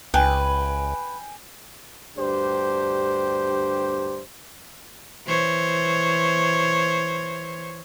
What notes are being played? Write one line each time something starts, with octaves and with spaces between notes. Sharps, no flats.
C#2 B4 G5 G#5
D2 G2 D4 G4 C5
E3 C5 C#5